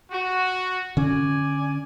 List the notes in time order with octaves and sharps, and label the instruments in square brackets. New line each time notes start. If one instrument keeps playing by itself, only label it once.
[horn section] F#4
[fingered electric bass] D3 C#4 [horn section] D5 G#5